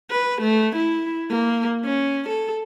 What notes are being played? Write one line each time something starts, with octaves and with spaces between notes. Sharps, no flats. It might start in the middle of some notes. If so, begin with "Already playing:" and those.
B4
A3
E4
A#3
C#4
A4